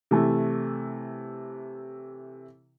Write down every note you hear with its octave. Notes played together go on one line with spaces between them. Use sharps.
C3 E3 A3